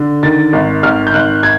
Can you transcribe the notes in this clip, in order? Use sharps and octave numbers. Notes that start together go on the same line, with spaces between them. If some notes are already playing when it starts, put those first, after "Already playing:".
Already playing: D3
D#3 A6
G#1
G#1 F6
G6
G#1 F#6
G#6